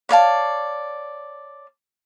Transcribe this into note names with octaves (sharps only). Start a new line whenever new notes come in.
C#5 D5 F5 A5